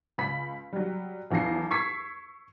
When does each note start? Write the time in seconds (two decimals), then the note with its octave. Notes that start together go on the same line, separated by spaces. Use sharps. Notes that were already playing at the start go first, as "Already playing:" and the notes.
0.18 C#2 B5 B6
0.73 F#3 G3
1.30 B1 E2 F3 A#6 C7
1.71 C#6 E6 G#6 B6 C7